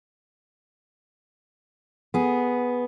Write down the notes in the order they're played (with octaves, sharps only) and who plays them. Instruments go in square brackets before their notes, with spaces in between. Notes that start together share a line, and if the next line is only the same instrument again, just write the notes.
[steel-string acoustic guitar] B3 G#4